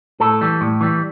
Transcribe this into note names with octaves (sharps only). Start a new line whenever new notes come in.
A2 A4
E3 G3
A2
E3 G3